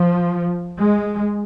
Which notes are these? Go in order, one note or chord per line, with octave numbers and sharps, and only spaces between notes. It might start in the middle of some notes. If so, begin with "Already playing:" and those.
Already playing: F3
G#3